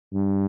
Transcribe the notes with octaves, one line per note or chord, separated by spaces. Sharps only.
G2